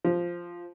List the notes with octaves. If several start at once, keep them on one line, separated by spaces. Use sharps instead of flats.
F3